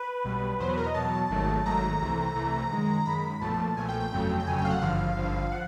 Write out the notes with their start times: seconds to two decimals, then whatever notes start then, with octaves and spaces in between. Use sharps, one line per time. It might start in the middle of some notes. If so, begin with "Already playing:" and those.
Already playing: B4
0.24 B1 B2 G3
0.60 E2 B2 F#3 C5
0.69 B4
0.77 A#4
0.86 D#5
0.94 E2 B2 F#3 A5
1.30 G#1 G#2 D#3 F#3 A3
1.66 G#1 G#2 D#3 F#3 A3 A#5
2.01 C2 C3 E3 A3
2.35 C2 C3 E3 A3
2.70 F#2 D#3 G#3
3.06 F#2 D#3 G#3 B5
3.41 B1 A#2 F3 A3 A5
3.76 B1 A#2 F3 A3 G#5
3.88 G5
4.00 G5
4.12 G1 F2 C#3 F#3 A3
4.40 G5
4.46 G1 F2 C#3 F#3 A3 G#5
4.58 G5
4.65 F5
4.70 F#5
4.82 G#1 G2 D3 F3 F5
5.17 G#1 G2 D3 F3
5.52 F3 F#5